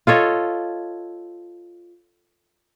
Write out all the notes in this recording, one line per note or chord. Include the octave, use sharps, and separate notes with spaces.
F4 A4 C#5 D#5